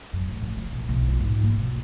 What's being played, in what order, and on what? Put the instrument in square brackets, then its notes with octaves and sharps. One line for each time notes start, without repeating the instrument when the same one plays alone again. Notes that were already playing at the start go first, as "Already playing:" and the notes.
[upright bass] F#2
A2
A2
C#3
A#2
B1
F4
G#2
A#3
B2